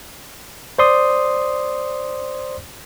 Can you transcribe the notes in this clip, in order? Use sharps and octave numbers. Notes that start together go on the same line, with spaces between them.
C5 D5 C6 D#6